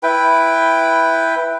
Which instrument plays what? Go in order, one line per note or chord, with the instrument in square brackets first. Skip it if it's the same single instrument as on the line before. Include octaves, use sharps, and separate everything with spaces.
[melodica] E4 B4 G5